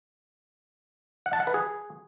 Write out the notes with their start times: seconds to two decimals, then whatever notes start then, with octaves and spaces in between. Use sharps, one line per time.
1.26 F#5
1.33 A5
1.40 F#5
1.47 B4
1.54 G#4